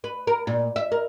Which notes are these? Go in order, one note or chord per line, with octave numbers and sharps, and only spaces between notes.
B4
A#4
A#2
E5
A#4